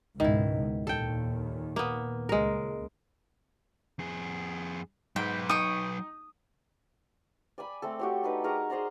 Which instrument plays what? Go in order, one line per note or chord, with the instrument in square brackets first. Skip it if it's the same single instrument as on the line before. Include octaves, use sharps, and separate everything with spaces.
[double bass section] C#2 G#2 B2 [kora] D#3 E4
[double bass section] D#2 A#2 D#3 [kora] A4 G5
[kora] A#3 B3
[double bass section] C#2 [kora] G#3 A#4
[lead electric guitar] F2 G#4
[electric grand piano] G#2 [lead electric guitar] F#3 B4 [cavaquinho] G5
[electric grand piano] D#4 [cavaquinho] G5 C#6 [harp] D#6
[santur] D5 G#5 B5
A3 C4 A4
F#4 G4 C#5
D4 D#4 B4
G#4 A#4 A#5 C#6
G#4 C5 D5 A#5